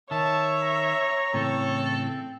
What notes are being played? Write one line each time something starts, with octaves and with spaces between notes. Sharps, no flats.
D#3 C#5 E5 A5
A#5
A2 C#3 E3 C4 A4